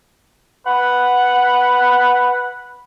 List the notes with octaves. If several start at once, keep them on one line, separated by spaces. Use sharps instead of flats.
B4 F#5